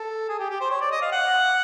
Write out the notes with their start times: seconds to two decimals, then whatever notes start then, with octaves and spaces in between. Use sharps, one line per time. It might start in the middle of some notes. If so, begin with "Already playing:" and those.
Already playing: A4
0.29 G#4
0.39 G4
0.50 G4
0.61 C5
0.70 C#5
0.81 D5
0.91 D#5
1.02 F5
1.12 F#5